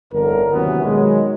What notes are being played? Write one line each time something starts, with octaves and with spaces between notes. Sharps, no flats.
G1 F2 A2 D3 A#4
D#2 C3 E3 F#3 B3 C#4
B1 D#3 F#3 G#3